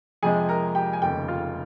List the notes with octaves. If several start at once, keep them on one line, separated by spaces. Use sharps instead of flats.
F2 C3 F3 G#3 G#4 G#5
A#4 A#5
G4 G5
G#5
F1 D#2 C#3 G4 G5
F4 F5